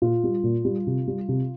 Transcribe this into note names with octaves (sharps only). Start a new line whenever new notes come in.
A#2 F4
G3
A#2
G3
C3
G3
C3